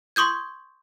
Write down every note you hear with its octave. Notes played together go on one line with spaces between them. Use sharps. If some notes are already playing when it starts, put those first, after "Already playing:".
C6 C#6 D#6 G6 G#6